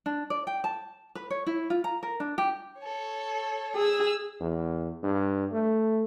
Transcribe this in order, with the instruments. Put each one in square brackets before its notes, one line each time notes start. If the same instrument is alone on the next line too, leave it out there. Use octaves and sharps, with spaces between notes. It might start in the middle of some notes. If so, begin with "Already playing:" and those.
[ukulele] D4
D5
G5
A5
B4
C#5
E4
F4
A#5
A#4
D4
G4
[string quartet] A4 C#5
[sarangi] G#4 [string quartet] E6
[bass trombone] E2
G2
A3